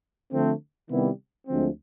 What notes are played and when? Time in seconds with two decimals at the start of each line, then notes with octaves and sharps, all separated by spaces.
0.32 D3 F3 A3 C4
0.90 C3 D#3 G3 B3 E4
1.47 D2 D3 F3 G#3 C4